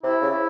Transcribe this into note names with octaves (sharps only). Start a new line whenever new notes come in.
C3 E4
C#3
E4